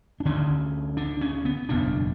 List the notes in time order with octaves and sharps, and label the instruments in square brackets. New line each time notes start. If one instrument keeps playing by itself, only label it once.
[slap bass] D4
D2 D3 C#4
D4
C#4
B3
F#1 E2 B2 D4